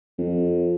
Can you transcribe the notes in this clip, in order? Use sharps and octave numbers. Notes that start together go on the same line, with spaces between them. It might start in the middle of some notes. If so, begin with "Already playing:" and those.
F2